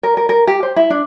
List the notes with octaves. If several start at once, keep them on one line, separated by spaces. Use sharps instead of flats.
A#4
A#4
A#4
G4
C5
E4
D4